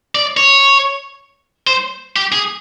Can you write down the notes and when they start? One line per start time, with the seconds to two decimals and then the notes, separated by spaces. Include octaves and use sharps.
0.15 D5
0.37 C#5
1.67 C5
2.16 G4
2.32 G#4